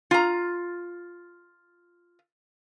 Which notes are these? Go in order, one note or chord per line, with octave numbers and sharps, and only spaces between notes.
F4 A#5